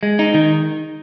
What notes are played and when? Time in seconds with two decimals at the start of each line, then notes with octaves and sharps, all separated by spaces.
0.03 G#3
0.19 D#4
0.34 D#3